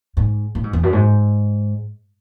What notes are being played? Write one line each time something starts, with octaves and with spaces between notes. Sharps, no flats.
G#2
A2
G#2
E2
F#2
G#2